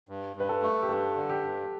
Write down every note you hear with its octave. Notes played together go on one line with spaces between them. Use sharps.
G2
G2 B4
A4
A3
G4
G2 A4
D3
G4
G2